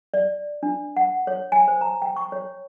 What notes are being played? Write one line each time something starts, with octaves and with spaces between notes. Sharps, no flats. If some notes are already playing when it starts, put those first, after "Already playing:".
D5
D4
F#5
C#5
G#5
C5
A#5
G5
C#6
C#5